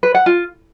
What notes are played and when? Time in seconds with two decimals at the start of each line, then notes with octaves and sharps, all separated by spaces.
0.03 B4
0.15 F#5
0.26 F4